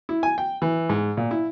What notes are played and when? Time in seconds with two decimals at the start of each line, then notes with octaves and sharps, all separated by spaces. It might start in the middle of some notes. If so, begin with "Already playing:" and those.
0.09 E4
0.23 G#5
0.38 G5
0.62 E3
0.89 G#2
1.17 A#2
1.31 E4